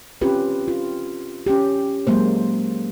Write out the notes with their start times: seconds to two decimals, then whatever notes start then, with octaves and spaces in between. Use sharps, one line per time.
0.21 C4 C#4 F4 G4 B4
0.68 F4
1.46 C#4 G4
2.07 F#3 G#3 A#3 C5